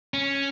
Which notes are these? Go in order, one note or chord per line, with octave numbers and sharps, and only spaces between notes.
C#4